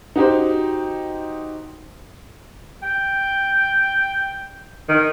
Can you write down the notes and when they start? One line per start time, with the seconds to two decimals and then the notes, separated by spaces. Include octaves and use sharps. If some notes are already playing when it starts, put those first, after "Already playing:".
0.16 D#4 F#4 G4 C5
2.82 G5
4.89 D#3